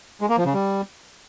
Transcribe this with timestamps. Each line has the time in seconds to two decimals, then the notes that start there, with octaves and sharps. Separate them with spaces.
0.21 G#3
0.29 A#3
0.37 F3
0.46 C#3
0.54 G3